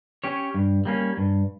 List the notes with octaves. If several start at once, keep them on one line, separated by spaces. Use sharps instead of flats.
C#4 G4 C#5
G2
G3 A#3 C#4
G2